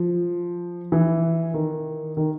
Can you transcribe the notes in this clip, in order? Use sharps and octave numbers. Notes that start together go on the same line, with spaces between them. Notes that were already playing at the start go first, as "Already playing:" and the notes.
Already playing: F3
E3
D#3
D#3